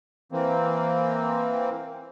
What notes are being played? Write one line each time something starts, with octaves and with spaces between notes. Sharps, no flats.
E3 A#3 C4